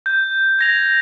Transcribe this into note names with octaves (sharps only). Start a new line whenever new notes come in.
G6
G#6 A#6 F7